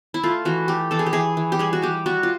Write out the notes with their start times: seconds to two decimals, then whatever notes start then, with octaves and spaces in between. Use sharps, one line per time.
0.14 E4
0.23 A3 F4
0.45 E3 F#4
0.68 A3 G4
0.91 E3 A4
0.99 G#4
1.06 G4
1.13 E3 G#4
1.37 E3
1.52 G4
1.59 G3 G#4
1.73 F#4
1.82 G3 G4
2.06 G3 F#4
2.23 F4